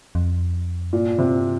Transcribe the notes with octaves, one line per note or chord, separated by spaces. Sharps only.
F2
G2 A#2
C3